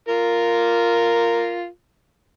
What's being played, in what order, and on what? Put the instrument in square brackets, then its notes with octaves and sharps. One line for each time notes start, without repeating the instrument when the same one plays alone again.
[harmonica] F4 A#4